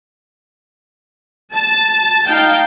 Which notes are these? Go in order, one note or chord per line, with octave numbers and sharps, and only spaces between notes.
A5
D#4 F5 G5